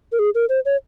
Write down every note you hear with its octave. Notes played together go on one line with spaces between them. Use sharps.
A#4
G#4
A#4
C5
C#5